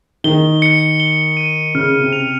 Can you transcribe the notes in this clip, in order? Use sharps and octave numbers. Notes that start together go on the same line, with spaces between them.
D#3 G7
C#7
G7
D#7
C#3 F6
C3
F7